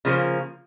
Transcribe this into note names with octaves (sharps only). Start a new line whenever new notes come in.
C#3 F3 A#3